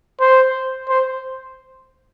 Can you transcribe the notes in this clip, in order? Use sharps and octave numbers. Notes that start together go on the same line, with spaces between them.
C5
C5